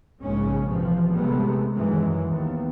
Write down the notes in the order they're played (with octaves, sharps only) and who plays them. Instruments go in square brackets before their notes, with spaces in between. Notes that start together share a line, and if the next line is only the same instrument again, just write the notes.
[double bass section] A#1 G#2 C#3 G#3 C#4
A2 C3 E3 F3
G2 C3 G#3 A3 B3
F#2 D#3 E3 F#3 G#3
D#2 B3